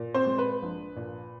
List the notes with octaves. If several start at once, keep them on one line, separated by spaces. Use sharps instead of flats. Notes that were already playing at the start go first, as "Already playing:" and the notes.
Already playing: A#2
C4 C5
G#3
B4
A#1
A#2